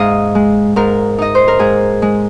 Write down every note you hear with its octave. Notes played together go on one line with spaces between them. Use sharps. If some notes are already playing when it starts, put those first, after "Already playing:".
Already playing: G#2 D#5 F5
G#3
G#2 A#4
D#4 D#5
C5
A#4
G#2 G#4
G#3